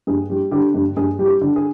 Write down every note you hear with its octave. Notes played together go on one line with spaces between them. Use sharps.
G2 G#4
G3
D3 G4
G2
G2 G#4
G3
G4
D3
G#4